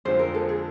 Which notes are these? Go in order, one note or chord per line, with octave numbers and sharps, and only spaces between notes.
F2 D3 F3 G#3 C5
A#4
A4
G#4